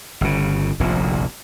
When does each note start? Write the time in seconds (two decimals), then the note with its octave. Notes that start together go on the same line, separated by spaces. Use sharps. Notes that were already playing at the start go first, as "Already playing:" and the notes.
0.21 G1 C#3
0.80 F1 A#1 D#2 A#2